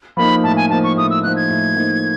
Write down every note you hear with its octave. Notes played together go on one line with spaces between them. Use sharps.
F3 A#3 D#4 B5
A2 A5
G#5
F3 A#3 D#4 A5
C#6
A2 D#6
E6
F3 A#3 D#4 F#6
G#6
A2
F3 A#3 D#4